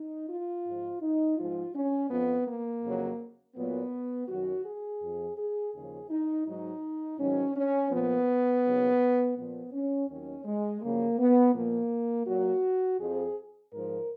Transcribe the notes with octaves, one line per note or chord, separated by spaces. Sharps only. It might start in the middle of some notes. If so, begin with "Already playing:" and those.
Already playing: D#4
F4
G#2 F3
D#4
G#2 F3 F4
C#4
F2 F3 B3
A#3
F2 C#3 F#3
A#2 F#3 B3
F#2 D#3 F#3 F#4
G#4
F2 F3
G#4
D#2 C#3 F3 G#4
D#4
G#2 F#3 D#4
G#2 D#3 F#3 C#4
C#4
A#2 F3 B3
D#2 C#3 F#3
A#2 F3 B3
C#4
D#2 D#3 F#3 C#4
G#3
F#2 C#3 F3 A#3
B3
A#2 F3 A#3
A#2 F#3 F#4
F2 F3 G#4
G#2 F3 A#4